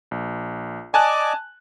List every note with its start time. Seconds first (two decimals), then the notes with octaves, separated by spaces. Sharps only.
0.11 A#1
0.94 D5 D#5 G#5 A5 D6 F#6